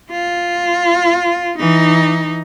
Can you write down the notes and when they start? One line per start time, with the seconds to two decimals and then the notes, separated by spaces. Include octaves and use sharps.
0.11 F4
1.59 E3 D#4